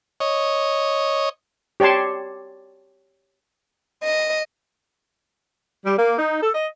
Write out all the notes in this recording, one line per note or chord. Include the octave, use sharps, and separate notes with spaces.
C#5 D#5
G4 C#5 D5 A5 C6
D#5
G3
A#3
D#4
A4
D#5